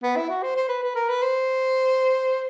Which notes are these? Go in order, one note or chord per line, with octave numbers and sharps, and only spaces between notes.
B3
E4
F#4
C5
C5
B4
B4
A#4
B4
C5